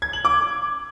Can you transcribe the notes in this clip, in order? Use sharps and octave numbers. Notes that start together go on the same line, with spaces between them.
G#6
F#7
D6